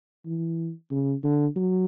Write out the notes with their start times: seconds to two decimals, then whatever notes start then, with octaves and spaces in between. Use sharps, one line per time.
0.26 E3
0.91 C#3
1.24 D3
1.56 F#3